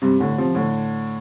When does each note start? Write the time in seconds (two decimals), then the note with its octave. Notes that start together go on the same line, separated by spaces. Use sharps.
0.02 G2 C3
0.20 A2 D3
0.38 C3 F3
0.55 A2 D3